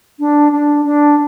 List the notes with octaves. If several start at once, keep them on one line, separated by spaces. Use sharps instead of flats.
D4
D4
D4